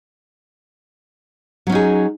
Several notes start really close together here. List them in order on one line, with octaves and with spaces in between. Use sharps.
F#3 C#4 D#4 G#4